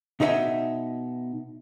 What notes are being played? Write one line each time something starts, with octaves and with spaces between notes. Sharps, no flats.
B2 D#4 G#4 C#5 E5 G#5